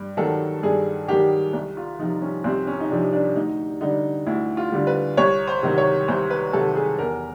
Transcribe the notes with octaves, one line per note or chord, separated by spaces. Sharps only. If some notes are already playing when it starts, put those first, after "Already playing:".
Already playing: G2
D#3 F#3 A4
G2 G#4
D#3 F#3 G4
C2
F4
C3 F3 D#4
C#4
C2 C4
C#4
D#4
C3 F3 D4
D4
D2 D#4
D3 G3 D#4
D2 E4
F4
D3 G3
B4
C2 C#5
C5
C3 D#3 F#3
C#5
C2 C5
B4
C3 D#3 F#3 A4
G#4
E2 A#4